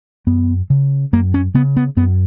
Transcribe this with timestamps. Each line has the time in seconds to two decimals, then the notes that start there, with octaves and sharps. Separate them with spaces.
0.27 F#2 B3
0.70 C#3
1.13 F#2 A#3
1.34 C#4
1.54 C#3 B3
1.77 B3
1.97 F#2 B3